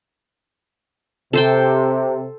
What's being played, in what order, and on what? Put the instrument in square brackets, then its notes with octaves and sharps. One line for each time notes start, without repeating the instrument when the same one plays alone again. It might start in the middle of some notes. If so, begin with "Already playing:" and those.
[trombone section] C3 [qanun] A4 C5 G5